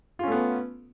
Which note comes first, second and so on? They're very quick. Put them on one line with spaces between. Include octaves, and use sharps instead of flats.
F4 C#4 A3 B3